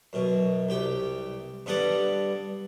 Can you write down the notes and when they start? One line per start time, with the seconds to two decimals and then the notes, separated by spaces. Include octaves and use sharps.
0.13 F#2 B2
0.69 C2 G4 G5
1.66 G2 G3 B3 A4 F#5 D6